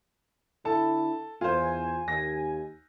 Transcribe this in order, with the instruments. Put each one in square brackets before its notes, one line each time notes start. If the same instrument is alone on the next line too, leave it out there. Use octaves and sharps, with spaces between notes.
[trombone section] D3 E4 [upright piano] A4 A5
[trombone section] E2 [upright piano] F4 C5 [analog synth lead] G#5
[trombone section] D#2 [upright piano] A#6